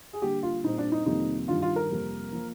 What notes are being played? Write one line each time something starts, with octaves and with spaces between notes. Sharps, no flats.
G#4
D3 G3 A#3 G4
F4
A#2 G3 C4 D#4
D4
D#4
F2 C3 D#3 G3 A#3 D#4
G2 D#3 G3 F4
F4
A#4
F2 C3 G3 A#3
F3 A#3